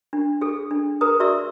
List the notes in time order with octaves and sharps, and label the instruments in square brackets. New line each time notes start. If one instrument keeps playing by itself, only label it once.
[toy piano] D4
G#4 A4
D4
G#4 A#4 B4 A#5 D#6
F#4 D5 E5 A#5 C#6 E6